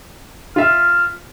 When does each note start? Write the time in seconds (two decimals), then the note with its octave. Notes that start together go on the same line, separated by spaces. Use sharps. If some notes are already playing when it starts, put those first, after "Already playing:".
0.56 F4 E5 F6